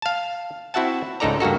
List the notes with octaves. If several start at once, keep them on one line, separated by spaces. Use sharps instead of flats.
F5 A5
C4 E4 F#4 E5 F#5 A5
C#2 G#2 D#4 A4 D5 A#5
G2 A#3 F#4 A4